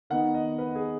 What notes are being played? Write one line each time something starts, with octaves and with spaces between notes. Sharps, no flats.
D#3 B3 D#4 F#5
D#5
B4
G#4